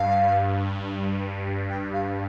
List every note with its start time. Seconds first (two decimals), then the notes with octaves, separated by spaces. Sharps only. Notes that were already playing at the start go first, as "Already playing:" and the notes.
Already playing: G2 F5
1.70 G5
1.93 F5